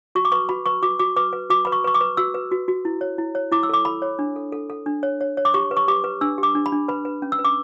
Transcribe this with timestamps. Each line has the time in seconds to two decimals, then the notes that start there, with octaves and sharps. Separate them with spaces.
0.15 F#4 C#6
0.25 D6
0.32 B4 C#6
0.49 F#4 B5
0.66 B4 C#6
0.83 F#4 D6
0.99 F#4 D6
1.16 B4 D6
1.33 B4
1.50 F#4 D6
1.65 B4 B5
1.72 C#6
1.84 B4 C#6
1.95 D6
2.01 B4
2.17 F#4 E6
2.34 B4
2.51 F#4
2.68 F#4
2.85 E4
3.01 C#5
3.18 E4
3.35 C#5
3.52 E4 D6
3.63 E6
3.69 A4 D6
3.85 A4 B5
4.02 C#5
4.19 D4
4.36 A4
4.52 A4
4.70 A4
4.86 D4
5.03 C#5
5.21 C#5
5.37 C#5
5.45 D6
5.54 G4 C#6
5.71 B4
5.77 C#6
5.88 G4 D6
6.04 B4
6.21 D4 E6
6.38 G4
6.43 D6
6.55 D4
6.66 B5
6.72 D4
6.88 B4 B5
7.05 B4
7.22 C#4
7.32 E6
7.39 B4
7.45 D6